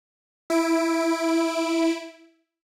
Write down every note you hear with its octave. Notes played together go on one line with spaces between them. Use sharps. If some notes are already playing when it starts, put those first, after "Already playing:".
E4 D7